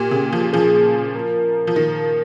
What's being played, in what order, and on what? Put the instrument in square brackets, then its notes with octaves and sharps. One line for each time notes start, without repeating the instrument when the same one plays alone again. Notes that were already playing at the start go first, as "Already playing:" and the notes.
Already playing: [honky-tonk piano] A#2 [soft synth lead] G4
[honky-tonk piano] C#3
F3
[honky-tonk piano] F3 [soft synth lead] G#4
[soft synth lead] A#4
[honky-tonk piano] F3
D#3